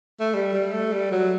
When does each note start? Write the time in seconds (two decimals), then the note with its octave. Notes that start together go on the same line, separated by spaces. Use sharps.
0.20 A3
0.34 G3
0.53 G3
0.72 A3
0.92 G3
1.12 F#3